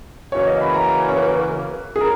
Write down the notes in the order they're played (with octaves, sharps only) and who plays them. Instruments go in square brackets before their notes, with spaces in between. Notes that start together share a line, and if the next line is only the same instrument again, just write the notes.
[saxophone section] C#3 E3 A#3 C#4 F#4 [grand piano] C#5
[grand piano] D#5
B5
A#5
C#5
B4
G#4
[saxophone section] C#4 [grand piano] A#4